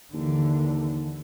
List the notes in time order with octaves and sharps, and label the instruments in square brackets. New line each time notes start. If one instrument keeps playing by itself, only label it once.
[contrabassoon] D#2 [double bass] D3 E3